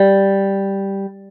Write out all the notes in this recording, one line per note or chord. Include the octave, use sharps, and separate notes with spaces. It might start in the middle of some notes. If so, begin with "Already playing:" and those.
Already playing: G3